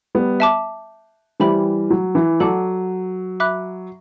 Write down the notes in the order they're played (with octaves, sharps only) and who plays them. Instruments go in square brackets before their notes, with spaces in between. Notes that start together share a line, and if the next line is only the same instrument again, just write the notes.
[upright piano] G3 B3
[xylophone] E5 A5 D6
[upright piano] E3 G3 [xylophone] G4 C5 E5 G5 B5
[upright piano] F#3
E3
[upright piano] F#3 [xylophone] A4 D5 F#5 A5 D6
[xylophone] E5 B5 D6 F#6